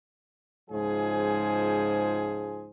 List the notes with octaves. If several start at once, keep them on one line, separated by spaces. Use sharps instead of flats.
C#2 G#2 F3 G#4 C5 G#5